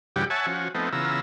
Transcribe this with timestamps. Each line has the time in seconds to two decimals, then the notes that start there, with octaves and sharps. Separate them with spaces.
0.16 G2 C#3 E3 G3 F#4 G4
0.30 C#5 E5 F#5 G#5 A5
0.47 F3 C#4 F#4
0.75 F3 A3 B3 C4 D#4
0.93 C#3 E3 B3 F4 A#5 E6